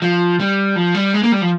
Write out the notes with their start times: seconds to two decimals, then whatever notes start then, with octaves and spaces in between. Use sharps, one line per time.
0.02 F3
0.40 G3
0.76 F3
0.94 G3
1.14 G#3
1.23 A#3
1.32 G3
1.42 F3